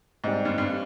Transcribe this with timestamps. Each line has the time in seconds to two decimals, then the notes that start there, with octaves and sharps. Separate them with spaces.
0.24 G#2 G3 C4 D#4
0.45 G2
0.58 G2